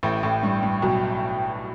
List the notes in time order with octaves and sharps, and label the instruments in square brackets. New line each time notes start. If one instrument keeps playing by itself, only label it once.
[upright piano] A1 A2 [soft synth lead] G5
[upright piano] A1 A2
G2
G2
B1 B2